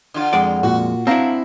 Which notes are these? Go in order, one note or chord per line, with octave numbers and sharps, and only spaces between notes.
D3 F4
F2 G#3 D5
A#2 F#4
C4 D4 E4 F5 A#5 A#6